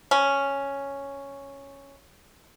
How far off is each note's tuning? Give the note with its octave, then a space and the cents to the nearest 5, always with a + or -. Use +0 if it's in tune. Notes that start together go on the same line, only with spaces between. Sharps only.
C#4 +0